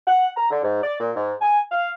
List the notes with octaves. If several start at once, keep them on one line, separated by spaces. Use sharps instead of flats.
F#5
A#5
D3
G#2
D5
A#2
G#2
G#5
F5